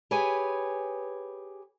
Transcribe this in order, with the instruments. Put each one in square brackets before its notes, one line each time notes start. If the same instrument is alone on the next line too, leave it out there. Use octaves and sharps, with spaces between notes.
[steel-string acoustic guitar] G4 G#4 B4 C#5 G#5